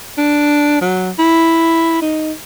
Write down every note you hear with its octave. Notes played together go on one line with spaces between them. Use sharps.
D4
F#3
E4
D#4